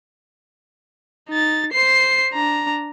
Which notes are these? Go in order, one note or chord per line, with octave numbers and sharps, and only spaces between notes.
D#4 A6
C5 C7
D4 A#5